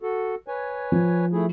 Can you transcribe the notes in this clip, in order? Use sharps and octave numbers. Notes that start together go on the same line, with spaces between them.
F#4 A4
B4 C#5 G#5
F3
A3 E4 G#4